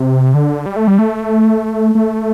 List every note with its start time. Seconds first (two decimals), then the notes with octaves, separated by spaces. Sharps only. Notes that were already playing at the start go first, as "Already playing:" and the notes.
Already playing: C3
0.34 D3
0.66 G3
0.76 A3
0.87 G3
0.99 A3
1.95 A3